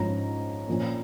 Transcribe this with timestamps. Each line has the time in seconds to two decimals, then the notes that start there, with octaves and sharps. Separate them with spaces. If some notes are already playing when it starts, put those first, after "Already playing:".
Already playing: G#2 F3 C#4 A#5
0.68 A#2 F3 C#4